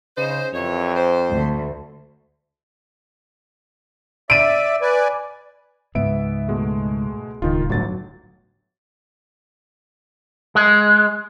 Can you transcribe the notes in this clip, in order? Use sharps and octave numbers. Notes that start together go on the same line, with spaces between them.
C#3 D#4 C5
F2 E3 G4 C#5
C5
D2
D5 E5 D7 D#7
B4 D5 G#5
C#2 G#2 B3 E5 D7
B2 G#3 A3
D1 C#2 D#3 D#4 F4
G1 A2 D3 F#3 A6
G#3